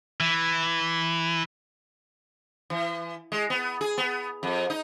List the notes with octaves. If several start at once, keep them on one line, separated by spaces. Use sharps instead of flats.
E3
E3
G#3
B3
G#4
B3
F2
D#4